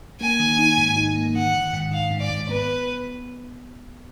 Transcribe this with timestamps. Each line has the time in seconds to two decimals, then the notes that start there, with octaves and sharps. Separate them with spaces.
0.21 A#3 G#5
0.39 D#3
0.58 D#4
0.78 G#2
0.96 D#4
1.16 A#3
1.35 D#3 F#5
1.54 D#3
1.73 G#2
1.91 D#3 F5
2.11 G#2
2.20 D5
2.30 G#2
2.49 B3 B4